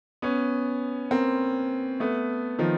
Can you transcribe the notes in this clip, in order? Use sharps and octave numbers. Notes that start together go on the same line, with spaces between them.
B3 C#4
A#3 C4
A3 B3
D#3 F3